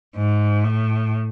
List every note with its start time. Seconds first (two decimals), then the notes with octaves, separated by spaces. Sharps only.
0.16 G#2
0.64 A2